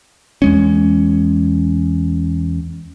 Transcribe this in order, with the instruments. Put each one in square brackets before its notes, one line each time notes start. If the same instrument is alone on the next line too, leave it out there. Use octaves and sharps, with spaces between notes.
[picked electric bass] E2 G#3 C#4